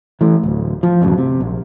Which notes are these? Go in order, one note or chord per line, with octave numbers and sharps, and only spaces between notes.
E3 A3
D1
F3
D1 A1 F#2
C3
A#1